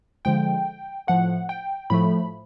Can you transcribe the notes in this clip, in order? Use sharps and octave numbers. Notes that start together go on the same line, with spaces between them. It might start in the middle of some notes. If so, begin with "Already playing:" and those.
D3 F3 G#3 G5
A2 F3 A3 F#5
G5
A2 F3 A3 B5